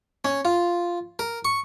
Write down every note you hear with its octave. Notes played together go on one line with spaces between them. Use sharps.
C#4
F4
A#4
C#6